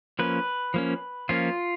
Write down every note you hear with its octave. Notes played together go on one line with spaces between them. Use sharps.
F3 A#3 C#4 B4
F3 A#3 C#4
F3 A#3 C#4 F4